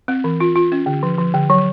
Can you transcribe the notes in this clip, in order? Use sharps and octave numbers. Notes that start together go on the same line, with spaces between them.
C4
E3
F4
F4
C#4
D3
F3
F3
D3
F#3